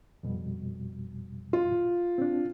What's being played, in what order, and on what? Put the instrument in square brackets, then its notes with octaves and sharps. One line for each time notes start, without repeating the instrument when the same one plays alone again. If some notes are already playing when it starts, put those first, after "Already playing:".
[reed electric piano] F2 B2 G3
[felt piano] F4
[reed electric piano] C4 D4